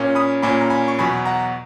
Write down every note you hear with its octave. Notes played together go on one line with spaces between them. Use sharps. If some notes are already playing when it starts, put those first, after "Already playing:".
Already playing: A#2 A#3 C#4
B5 D#6
A#2 A#3 C#4 G#5 B5
A#5
G#5 B5
C#6
E2 B2 F#3 G#5 B5
F#5 A#5